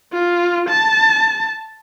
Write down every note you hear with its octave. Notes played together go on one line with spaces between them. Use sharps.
F4
A5